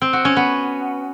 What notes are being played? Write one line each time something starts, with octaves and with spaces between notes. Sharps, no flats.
C4
F#4
C#4
B3